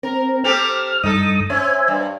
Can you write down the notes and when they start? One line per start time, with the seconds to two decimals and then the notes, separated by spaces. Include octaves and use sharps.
0.03 C4 A#4
0.44 C4 G4 A4 F6
1.03 G2 D#4 A4 D#6
1.50 C#4 C5 E5 G#5
1.88 G2